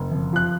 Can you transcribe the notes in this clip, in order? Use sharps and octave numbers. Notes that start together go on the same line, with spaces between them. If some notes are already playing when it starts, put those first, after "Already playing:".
Already playing: F#1
F2
F3 F#6